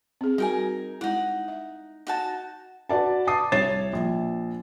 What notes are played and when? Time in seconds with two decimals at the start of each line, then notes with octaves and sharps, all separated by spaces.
0.21 C4 G#4
0.38 G3 D#4 F#4 A#4 G5 G#5
1.01 G#3 D#4 E4 F#5
1.48 E5
2.07 D#4 F#4 A5
2.89 F#4 B4 D5 A5
3.27 A5 D6 D#6 C7
3.52 C2 C#5 A6 C7 E7
3.93 A#1